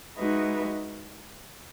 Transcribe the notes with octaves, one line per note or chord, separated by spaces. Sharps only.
G#3 D#4 F#4 B4 E5